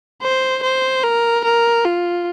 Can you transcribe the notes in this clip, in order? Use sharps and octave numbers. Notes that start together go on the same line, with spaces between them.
C5
C5
A#4
A#4
F4